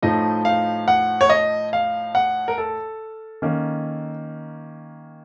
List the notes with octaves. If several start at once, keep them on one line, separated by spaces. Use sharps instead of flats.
A2 F3 A3 D#4 D#5
F5
F#5
C#5
D#5
F5
F#5
A#4
A4
D#3 A#3 C#4